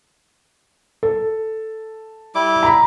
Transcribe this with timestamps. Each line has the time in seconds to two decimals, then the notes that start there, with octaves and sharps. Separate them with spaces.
1.03 A4
2.35 G3 E4 D6
2.63 A#5 B5